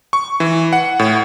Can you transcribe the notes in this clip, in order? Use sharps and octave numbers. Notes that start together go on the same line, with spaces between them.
C#6
E3
F#5
A2